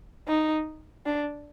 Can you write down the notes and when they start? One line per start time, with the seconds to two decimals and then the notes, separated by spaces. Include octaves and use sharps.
0.28 D#4
1.06 D4